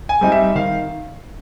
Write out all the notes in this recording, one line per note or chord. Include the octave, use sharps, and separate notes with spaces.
G#5
G3 C4 D#4
E5
D#3 F5